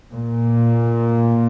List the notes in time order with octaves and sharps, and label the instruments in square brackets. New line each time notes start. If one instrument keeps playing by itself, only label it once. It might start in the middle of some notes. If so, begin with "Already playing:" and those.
[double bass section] A#2